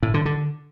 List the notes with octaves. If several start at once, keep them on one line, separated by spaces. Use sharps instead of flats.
A2
D3
D3